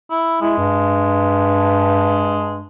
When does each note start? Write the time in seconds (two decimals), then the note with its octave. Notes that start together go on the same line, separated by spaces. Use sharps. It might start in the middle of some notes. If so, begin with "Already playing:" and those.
0.11 E4
0.41 G#3 E4
0.57 G2